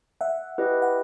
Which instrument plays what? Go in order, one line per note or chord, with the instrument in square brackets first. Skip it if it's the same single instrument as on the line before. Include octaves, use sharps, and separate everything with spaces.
[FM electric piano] E5 F#5
[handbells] E4 G4 B4 D#5 G5
[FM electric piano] F#5